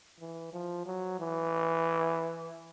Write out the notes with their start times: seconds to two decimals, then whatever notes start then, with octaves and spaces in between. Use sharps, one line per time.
0.20 E3
0.53 F3
0.86 F#3
1.20 E3